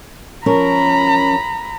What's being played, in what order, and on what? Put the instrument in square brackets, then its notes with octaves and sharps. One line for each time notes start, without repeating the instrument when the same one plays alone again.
[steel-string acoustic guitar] F3 C#4 A#4 [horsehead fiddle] A#5 B5